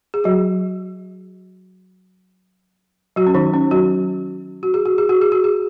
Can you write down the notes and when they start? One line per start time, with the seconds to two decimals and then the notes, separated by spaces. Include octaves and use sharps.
0.14 G#4
0.24 F#3 F#4
3.16 F#3 F#4
3.27 C#4
3.35 D#3 D#4
3.53 C#4
3.71 F#3 F#4
4.63 F#4
4.74 G#4
4.86 F#4
4.98 G#4
5.09 F#4
5.21 G#4
5.32 F#4
5.44 G#4